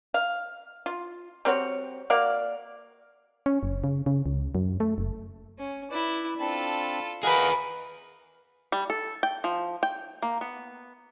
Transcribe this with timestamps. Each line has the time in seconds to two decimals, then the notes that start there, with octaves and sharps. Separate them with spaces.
0.14 F5
0.86 F4
1.45 G3 C4 F#4 C#5
2.10 A#3 F#4 D5 F5
3.46 C#4
3.63 F#1
3.84 C#3
4.06 C#3
4.26 C#2
4.55 F#2
4.80 A3
4.98 F#1
5.59 C#4
5.91 E4 B4 D5
6.40 C4 D4 F4 A4 B5
7.23 G#4 A#4 B4 D#5 F5 F#5 B5
8.72 G3
8.90 A4
9.23 G5
9.44 F3
9.83 G5
10.22 A#3
10.41 B3